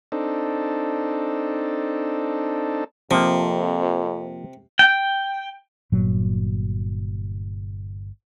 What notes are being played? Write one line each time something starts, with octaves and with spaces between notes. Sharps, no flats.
C4 D4 D#4 A4
F2 C3 F3 A#3
G5
G1 A#2 F#3